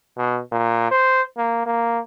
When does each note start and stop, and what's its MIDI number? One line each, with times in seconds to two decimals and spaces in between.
0.17 0.40 47
0.52 0.88 46
0.91 1.22 72
1.37 1.62 58
1.66 1.99 58